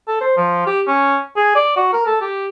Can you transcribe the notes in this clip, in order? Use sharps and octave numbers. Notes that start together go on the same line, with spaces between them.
A4
C5
F3
G4
C#4
G#4
D5
F#4
A#4
A4
G4